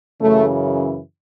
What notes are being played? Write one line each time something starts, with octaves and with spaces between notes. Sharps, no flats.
F#2 C#3 E3 A3